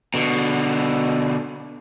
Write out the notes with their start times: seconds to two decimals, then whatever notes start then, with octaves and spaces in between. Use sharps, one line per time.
0.14 B2 D3